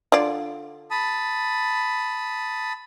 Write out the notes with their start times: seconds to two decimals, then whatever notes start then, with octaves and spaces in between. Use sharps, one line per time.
0.12 D3 F4 D5
0.91 A5 B5 D#6